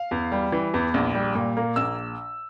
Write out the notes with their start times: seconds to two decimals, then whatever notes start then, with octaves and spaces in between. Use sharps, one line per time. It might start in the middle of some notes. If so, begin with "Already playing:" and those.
Already playing: F5
0.11 E2
0.32 G3
0.52 E3
0.74 E2
0.94 A#1
1.15 G3
1.35 A#2
1.57 A#3
1.76 A#1 E6